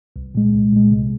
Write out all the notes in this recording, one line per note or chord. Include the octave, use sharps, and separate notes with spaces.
C2
A#2 G#3
C2
A#2 G#3
C3